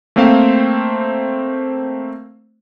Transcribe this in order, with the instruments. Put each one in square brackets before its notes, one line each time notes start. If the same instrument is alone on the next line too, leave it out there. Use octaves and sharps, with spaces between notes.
[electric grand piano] A3 A#3 C4 C5 F5